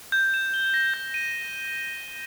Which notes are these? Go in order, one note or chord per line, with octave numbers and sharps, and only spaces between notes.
G6
E7
G7
A#6
G6
D#7